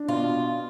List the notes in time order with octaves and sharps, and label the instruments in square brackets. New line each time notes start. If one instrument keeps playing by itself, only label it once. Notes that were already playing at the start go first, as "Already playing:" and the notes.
Already playing: [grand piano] D4
[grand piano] B2 [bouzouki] F4